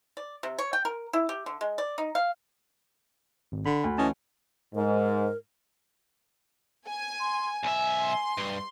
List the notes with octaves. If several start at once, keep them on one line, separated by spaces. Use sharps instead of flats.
D5
C3
C#5
G5
A#4
E4
G4
D3
G#3
D5
D#4
F5
G#1
D3 B5
D2
E3 C#4 D#5 A5
G#2 A#4
G#5
C6
B1 E5 G#5
C6
G2